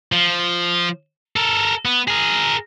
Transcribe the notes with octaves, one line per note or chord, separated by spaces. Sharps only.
F3
A4 A#4
B3
G#4 A#4